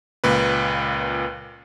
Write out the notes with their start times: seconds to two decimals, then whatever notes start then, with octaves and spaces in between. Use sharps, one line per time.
0.24 C#2 A#2 B4